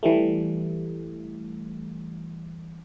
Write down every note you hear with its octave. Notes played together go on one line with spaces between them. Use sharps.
E3 G3 A3